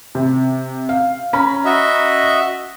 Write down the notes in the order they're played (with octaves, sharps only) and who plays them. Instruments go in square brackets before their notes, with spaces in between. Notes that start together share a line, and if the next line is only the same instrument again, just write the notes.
[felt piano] C3
F5
C#4 A#5 B5
[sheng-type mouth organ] F#4 D#5 E5